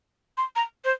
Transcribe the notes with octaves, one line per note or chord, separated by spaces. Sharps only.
C6
A#5
C5